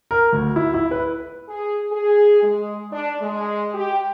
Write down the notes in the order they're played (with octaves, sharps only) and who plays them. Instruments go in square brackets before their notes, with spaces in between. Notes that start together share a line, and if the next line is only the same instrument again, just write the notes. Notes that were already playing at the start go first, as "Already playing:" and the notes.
[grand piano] A#4
D2
E4
E4
B4
[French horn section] G#4
G#4
G#3
D4
G#3
G4